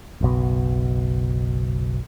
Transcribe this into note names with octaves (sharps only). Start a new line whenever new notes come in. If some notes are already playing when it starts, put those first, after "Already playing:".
F#1 B1 B2